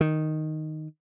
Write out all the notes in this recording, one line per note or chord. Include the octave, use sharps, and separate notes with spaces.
D#3